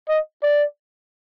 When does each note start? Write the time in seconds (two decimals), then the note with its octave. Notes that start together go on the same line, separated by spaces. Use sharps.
0.09 D#5
0.43 D5